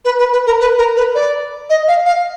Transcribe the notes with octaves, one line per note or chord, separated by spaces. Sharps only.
B4
B4
B4
A#4
B4
A#4
B4
D5
D#5
F5
F5